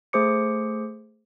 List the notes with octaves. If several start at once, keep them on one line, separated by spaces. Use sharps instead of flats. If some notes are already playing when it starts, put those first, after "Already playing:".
A3 G#4 C5 D6 C#7